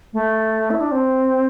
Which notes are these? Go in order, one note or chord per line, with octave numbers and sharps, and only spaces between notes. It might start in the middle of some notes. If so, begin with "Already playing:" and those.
A3
E4
D4
C4